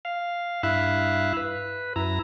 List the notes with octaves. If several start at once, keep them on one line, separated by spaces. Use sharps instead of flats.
F5
G2 E4 E5 F5 F#6
B4
F#2 E4 A#5